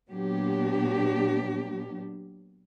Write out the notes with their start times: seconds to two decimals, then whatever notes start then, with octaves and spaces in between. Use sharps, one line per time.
0.10 A#2 F#3 B3 D4 G4